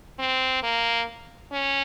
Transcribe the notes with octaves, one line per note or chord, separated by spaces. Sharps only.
C4
A#3
C#4